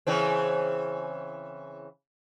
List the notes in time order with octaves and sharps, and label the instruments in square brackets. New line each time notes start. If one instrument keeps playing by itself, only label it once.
[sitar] C#3 E3 C4